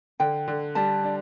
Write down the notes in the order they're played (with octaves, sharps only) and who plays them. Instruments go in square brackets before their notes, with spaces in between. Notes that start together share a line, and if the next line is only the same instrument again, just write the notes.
[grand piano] D3 [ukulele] G5
[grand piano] D3
[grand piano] G3 [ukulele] A5
[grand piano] D4